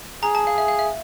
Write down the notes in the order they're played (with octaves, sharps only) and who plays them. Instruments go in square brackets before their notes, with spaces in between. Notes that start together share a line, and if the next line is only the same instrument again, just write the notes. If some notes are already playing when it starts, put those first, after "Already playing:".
[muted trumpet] G#4 [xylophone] A#5
[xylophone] A5
F5
E5
F5
E5